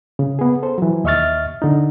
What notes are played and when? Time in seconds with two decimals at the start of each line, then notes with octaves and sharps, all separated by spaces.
0.19 C#3
0.39 B3 G#4
0.63 A4 C5
0.78 E3 F#3
1.04 D#2 D#5 E5 C#6 F6 A6
1.62 D3 D#4